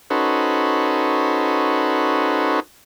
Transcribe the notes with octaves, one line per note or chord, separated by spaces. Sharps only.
C#4 D#4 F#4 A4 B4 C5